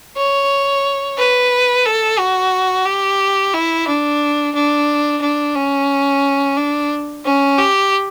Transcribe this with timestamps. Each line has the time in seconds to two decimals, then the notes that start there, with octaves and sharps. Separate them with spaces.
0.17 C#5
1.18 B4
1.85 A4
2.19 F#4
2.86 G4
3.54 E4
3.87 D4
4.55 D4
5.22 D4
5.56 C#4
6.57 D4
7.24 C#4
7.58 G4